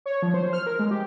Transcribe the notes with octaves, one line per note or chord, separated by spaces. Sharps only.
C#5
F3
C5
F6
A#4
G#3
G4